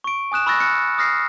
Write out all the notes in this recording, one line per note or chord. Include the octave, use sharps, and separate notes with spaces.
C#6 D7
G#5 D#6 F#6 E7
B5 C#6 E6 F#6 A6 A#6
F6 F#6 C#7
D#6 F6 A#6 C7